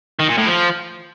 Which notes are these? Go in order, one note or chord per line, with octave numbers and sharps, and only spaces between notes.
D#3
A#2
A2
F3